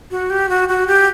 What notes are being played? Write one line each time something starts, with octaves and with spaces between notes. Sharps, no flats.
F#4
G4
F#4
F#4
G4